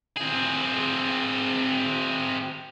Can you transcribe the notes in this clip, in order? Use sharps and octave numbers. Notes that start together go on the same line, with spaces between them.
C4 G#4